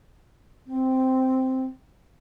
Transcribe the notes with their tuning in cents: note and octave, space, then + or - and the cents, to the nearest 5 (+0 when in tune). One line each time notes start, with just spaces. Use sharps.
C4 -5